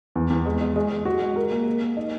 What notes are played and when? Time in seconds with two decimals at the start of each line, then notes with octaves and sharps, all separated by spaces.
0.15 E2
0.30 E2
0.46 G#3
0.61 G#3
0.76 G#3
0.91 G#3
1.05 F#4
1.21 G#3
1.36 A#4
1.51 A#3
1.67 A#3
1.81 A#3
1.97 D#4